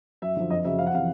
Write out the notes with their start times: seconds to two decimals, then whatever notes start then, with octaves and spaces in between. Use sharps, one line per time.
0.22 F#2 E5
0.36 D3 F3
0.50 F2 D#5
0.65 C#3 F#3 E5
0.79 F2 F5
0.86 F#5
0.94 C3 E3 F5